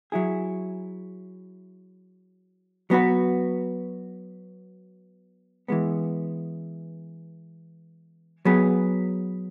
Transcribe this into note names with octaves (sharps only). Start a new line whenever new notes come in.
F#3 E4 G#4
F#3 B3 F#4 B4
E3 G#3 B3
F#3 B3 G#4 B4